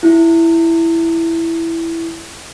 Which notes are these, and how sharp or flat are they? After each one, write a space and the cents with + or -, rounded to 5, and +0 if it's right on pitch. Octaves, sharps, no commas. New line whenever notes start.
E4 +5